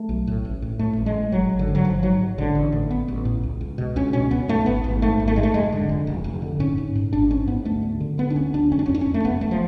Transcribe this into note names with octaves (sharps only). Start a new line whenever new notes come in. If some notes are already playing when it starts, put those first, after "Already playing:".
Already playing: A3
B1
A2
A1
A2
A2 A3
A1
G#3
A2
G#1 F#3
G#1
D3
G#2
F#3
G#1 F3
G#2 F#3
G#2
A1 D3
A1
A2
A1 B3
A1
A2
C#2
C#2
B2
C#2 C#4
B2 C#4
C#2 B3
G#2 A3
G#1 B3
G#1
G#2 A3
G#1
A3
G#2 G#3
A3
F1 G#3
D3
F1
F1
F1
D3
G#2 C#4
G#2
G#2
G#1 D4
G#2 C#4
G#2 B3
D2 A3
D2
D3
D3 B3
D4
D2 C#4
D2 D4
F1 C#4
D4
C#4
F2
D4
C#4
F2
A3
F1 B3
F1 A3
F3